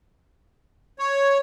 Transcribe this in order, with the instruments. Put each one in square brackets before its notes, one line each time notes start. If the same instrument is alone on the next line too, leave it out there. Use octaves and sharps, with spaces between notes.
[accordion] C#5